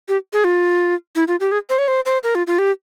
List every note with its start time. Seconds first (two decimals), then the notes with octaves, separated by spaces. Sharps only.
0.09 G4
0.33 G#4
0.44 F4
1.16 E4
1.28 F4
1.40 G4
1.52 G#4
1.70 C5
1.78 C#5
1.88 C5
2.06 C5
2.23 A#4
2.35 F4
2.47 F4
2.59 G4